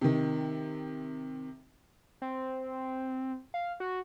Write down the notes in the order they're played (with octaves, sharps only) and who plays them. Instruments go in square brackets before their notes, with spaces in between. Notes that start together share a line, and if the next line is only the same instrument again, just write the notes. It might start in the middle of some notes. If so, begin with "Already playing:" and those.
[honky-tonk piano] C3 D#3
[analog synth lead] C4
F5
F#4